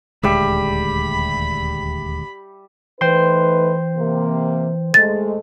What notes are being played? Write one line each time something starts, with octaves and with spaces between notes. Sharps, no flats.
D#1 D2 G3 G#3 E5 B5
E3 A3 D#4 B4 C5 G5 C6
C3 A#3
G#3 A3 A6